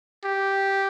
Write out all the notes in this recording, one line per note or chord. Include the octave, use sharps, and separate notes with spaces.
G4